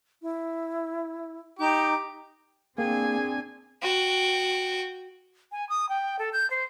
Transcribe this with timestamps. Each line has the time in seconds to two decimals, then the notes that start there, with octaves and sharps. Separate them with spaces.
0.22 E4
1.59 D#4 G4 D6
2.78 A#3 C4 D4 G#4 G5 G#5
3.82 F#4 G5
5.52 G#5
5.69 D#6
5.89 G5
6.19 A4
6.33 G6
6.50 C5